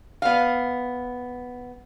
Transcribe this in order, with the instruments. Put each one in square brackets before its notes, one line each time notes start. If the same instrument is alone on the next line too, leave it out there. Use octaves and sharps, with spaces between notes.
[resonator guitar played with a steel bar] B3 F5